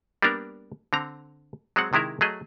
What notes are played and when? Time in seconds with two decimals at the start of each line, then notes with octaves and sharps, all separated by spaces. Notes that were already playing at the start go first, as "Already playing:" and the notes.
0.22 G3 A#3 B3 D4 A#4
0.93 D3 C4 A#5
1.76 F#3 G#3 C4 F#5
1.93 C3 D#3 G#3 E4 A#4
2.21 F#3 A3 G#4 D#5